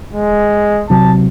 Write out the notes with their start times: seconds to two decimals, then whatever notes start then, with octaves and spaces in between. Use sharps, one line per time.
0.13 G#3
0.90 C3 F#3 A5